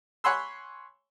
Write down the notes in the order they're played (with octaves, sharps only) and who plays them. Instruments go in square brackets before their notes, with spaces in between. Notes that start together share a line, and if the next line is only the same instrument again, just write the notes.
[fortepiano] C#5 F#5 G#5 B5 C6 E6